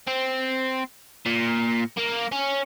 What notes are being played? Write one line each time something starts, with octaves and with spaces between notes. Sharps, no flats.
C4
A#2
A#3
C#4